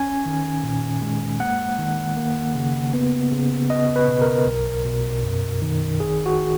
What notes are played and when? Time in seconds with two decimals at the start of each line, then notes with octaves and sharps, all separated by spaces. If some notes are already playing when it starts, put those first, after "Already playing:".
Already playing: C#4 G#5
0.26 D#3
0.63 A#2
1.02 G#3
1.40 A#3 F#5
1.79 D#3
2.17 A#3
2.55 C#3
2.94 B3
3.32 C#3
3.70 B3 D#5
3.96 B4
4.08 B2
4.21 A#4
4.47 B1
4.85 B2
5.23 F#2
5.62 D#3
6.00 G#1 G#4
6.26 F#4